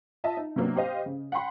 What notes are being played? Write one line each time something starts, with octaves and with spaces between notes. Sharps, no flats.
F4 D#5 E5 A5
D#4
C3 F#3 A#3 B3 D4
G4 C5 D#5 F5
C#3
F#5 G5 B5 C6